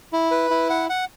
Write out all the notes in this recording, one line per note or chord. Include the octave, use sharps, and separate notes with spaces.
E4
B4
E4
F#5
F#5